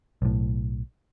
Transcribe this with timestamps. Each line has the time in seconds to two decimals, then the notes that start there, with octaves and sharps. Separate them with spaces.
0.22 B1 A2